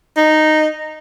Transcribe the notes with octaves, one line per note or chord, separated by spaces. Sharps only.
D#4